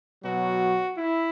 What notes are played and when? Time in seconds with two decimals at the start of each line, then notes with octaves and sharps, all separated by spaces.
0.24 B2 F#3 F#4
0.98 E4